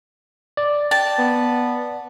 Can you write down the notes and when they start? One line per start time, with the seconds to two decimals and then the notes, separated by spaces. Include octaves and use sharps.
0.57 D5
0.91 G5 A5
1.18 B3